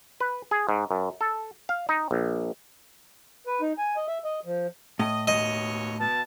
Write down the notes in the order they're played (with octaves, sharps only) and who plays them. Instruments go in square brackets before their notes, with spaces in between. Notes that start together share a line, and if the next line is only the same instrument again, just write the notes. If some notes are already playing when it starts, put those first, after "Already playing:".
[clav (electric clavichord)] B4
G#4
G#2
F#2
A4
F5
D#4
A#1
[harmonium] B4
D#4
G#5
D#5
E5
D#5
F3
[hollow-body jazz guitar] A2 [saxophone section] D#5
[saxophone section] D#2 B2 C#5 [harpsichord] D#5
[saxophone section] B2 [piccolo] A5